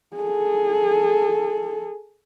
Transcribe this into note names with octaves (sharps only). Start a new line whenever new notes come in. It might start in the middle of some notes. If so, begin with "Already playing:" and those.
G#4 A4